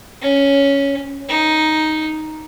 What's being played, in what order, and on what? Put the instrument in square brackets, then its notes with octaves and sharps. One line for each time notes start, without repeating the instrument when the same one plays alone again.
[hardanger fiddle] C#4
D#4